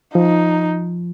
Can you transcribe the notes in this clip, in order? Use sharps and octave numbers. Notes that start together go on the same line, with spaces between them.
F3 D#4